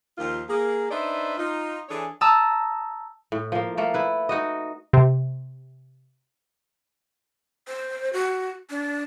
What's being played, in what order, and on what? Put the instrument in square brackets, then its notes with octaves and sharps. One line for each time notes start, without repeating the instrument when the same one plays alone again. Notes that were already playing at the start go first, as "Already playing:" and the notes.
[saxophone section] D#2 D#3 F3 A#3 F4
A#3 G#4
D4 D#4 B4 C5 D5 E5
D#4 F4
E3 D4 G#4 A4 C#5
[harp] A5 A#5 D#6 E6
[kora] A2
F3 A#3
A3 A#3 A4
E4 B4
D#4 F#4 D#5
[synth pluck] C3
[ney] C5
F#4
D4